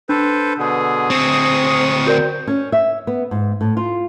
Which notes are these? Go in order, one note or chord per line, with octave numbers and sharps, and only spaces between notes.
D4 A4 B4 C5
B2 D3 G#4
D2 C4 C#6 D#6
F#4 A#4 D5 G5
C#4
E5
B3
G#2
A2
F4